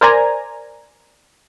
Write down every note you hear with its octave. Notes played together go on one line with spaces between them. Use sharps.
A#4 C5 D5 G#5 A#5